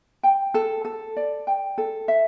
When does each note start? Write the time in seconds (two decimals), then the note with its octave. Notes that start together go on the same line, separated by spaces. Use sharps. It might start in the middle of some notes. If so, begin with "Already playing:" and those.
0.23 G5
0.54 A4
0.85 A4
1.17 D5
1.47 G5
1.78 A4
2.08 E5